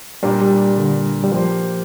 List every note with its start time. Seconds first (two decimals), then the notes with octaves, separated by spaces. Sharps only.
0.23 A#2 G3 A#3 D4 G4 A#4
0.42 G3
0.78 D3
1.24 G3
1.31 F3 A#3 G4 C5